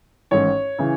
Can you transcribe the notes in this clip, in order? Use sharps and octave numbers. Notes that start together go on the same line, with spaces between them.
A1 G#2 D#3 C#5
C#3 E3